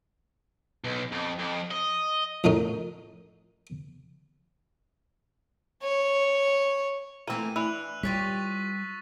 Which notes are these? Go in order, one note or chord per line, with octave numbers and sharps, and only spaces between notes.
B1
F2
F2
D#5
F2 A2 D#3 C#4 D#4
C#5
E3 A3 A#3 C4 D#7
E3 D4 E6 F#6 F7
G3 F4 G4 C#5 C#6 A6 B6